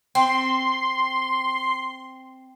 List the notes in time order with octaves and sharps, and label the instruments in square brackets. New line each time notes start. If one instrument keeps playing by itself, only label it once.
[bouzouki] C4 [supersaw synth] C6